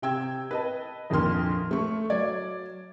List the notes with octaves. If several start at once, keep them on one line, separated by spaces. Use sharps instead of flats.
C3 G5 E6 G#6
B4 D#5 A5
A#1 F2 D3 D#3 C6 F6
A3 C#6
F#3 D5 G#6